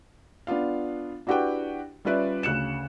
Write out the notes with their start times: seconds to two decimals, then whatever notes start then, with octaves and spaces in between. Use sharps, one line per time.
0.47 B3 D4 F4 F5
1.27 D4 E4 F#4 G4 B4 G5
2.05 G3 C#4 F4 B4 D5 E5
2.43 D2 C#3 F#6 C#7 E7